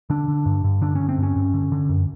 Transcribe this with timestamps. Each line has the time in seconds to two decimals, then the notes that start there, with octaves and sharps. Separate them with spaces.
0.10 D3 D4
0.28 D3
0.46 G2
0.64 G2
0.81 D3 D4
0.95 D3 C#4
1.09 C4
1.18 G2
1.23 C#4
1.36 G2
1.54 D3
1.72 D3
1.89 F#2